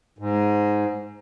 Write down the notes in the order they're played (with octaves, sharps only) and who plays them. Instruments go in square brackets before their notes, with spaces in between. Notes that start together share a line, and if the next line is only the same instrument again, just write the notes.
[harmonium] G#2